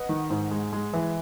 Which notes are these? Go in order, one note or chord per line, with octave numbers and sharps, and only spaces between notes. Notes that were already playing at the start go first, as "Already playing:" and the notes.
Already playing: B4 D#5 F#5
D#3
G#2
G#3
G#3
E3